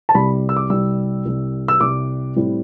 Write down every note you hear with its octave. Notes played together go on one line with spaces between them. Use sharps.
A5
C2 C3 G3 B5
E6
D6
C2 C3 G3 E6
C2 C3 G3
E6
C2 C3 G3 D6
A2 G3 C4 E4